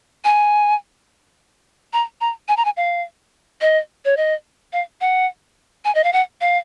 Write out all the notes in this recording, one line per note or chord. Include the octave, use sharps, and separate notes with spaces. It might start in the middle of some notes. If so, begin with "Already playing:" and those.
G#5
A#5
A#5
G#5
A#5
G#5
F5
D#5
C#5
D#5
F5
F#5
G#5
D#5
F5
F#5
F5